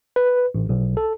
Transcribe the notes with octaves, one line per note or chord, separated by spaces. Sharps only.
B4
A1
B1
A4